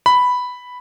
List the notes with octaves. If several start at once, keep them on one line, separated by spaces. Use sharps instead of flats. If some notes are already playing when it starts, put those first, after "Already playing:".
B5